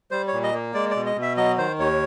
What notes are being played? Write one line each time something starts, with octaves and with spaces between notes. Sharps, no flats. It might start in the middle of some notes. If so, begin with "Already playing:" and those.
G3 C5
C#5
A#2
D#5
A#3
G#3 D5
D5
B2
D#5
B2
E5
F#3 D#5
D#3 C5
D#2 C#5